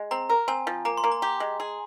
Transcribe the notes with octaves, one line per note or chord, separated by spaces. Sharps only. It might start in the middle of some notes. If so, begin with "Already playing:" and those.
Already playing: G#3
C4 A#5
A#4
C4 G#5
F3
A#3 A#5
C6
A#3
A#5
G4
G#3
G#4